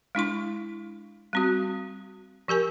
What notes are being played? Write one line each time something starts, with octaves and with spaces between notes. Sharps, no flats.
G#3 D4 E4 C6
G3 C4 F#4
F3 G4 A#4 G#5